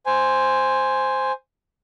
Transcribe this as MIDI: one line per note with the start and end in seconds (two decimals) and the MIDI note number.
0.06 1.32 72
0.06 1.32 80